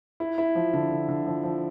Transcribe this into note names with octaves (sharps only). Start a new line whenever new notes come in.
E4
E4
F3
D3
D3
D3
F3
F3